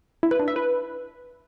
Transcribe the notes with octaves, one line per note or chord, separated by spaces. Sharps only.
E4
B4
D4
E5
B4